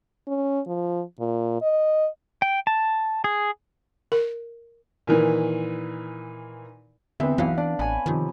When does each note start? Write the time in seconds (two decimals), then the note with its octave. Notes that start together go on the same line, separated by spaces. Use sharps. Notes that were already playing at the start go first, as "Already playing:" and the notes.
0.28 C#4
0.67 F3
1.20 A#2
1.62 D#5
2.42 G5
2.67 A5
3.24 G#4
4.12 A#4
5.07 A#2 D#3 E3
7.20 E2 D3 C4 B4 E5
7.38 B1 E3 B4 F5 F#5
7.58 D4 D5
7.79 A1 C#5 G#5 B5
8.06 C3 D#3 F3